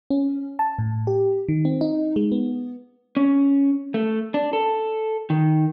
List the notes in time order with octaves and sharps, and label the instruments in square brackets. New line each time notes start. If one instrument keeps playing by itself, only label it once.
[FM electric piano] C#4
A5
A2
G4
D#3
C4
D#4
G#3
B3
[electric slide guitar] C#4
A3
D4
A4
D#3